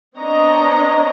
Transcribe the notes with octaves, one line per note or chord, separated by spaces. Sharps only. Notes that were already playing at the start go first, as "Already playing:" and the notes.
B3 C4 D4 C#5 D#5 A#5